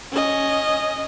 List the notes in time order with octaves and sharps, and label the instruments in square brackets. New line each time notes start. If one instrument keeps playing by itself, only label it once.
[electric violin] C#4 D#5